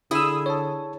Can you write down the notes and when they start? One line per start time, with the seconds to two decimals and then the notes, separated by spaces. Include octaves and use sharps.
0.11 D3 E4 G#4 D#6 E6
0.46 C#5 A5